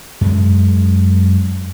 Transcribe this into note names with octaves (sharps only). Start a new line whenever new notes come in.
F#2 G#3